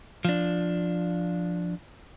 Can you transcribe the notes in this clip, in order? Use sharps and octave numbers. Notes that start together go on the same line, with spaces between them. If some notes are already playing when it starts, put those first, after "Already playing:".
F3 D4